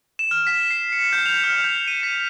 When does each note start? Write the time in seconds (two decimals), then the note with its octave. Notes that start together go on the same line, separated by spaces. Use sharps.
0.19 E7
0.31 F6
0.47 B6
0.71 C7
0.92 C#7
1.13 G6
1.26 F7
1.44 F6
1.64 G6
1.88 D#7
2.03 B6